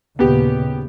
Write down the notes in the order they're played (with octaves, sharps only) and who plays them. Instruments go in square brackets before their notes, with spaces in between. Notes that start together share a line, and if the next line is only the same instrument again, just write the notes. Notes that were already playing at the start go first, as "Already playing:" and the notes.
[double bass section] D#2 A#2 C#3 [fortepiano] B3 G4